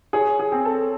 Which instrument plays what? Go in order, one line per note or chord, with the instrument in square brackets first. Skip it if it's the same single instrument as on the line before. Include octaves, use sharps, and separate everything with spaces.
[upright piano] G#4 [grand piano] C#5
[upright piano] G#4
[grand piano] C4
[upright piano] A4